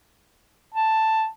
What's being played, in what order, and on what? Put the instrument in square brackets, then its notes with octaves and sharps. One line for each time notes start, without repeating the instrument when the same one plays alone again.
[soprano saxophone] A5